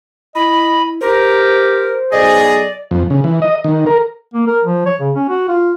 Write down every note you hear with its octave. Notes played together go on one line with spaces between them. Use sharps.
E4 D#5 B5
G4 A#4 C5
B1 G#4 D5 D#5
F2
C#3
E3
D#5
D#3
A#4
A#3
A#4
F3
C#5
C#3
C#4
F#4
F4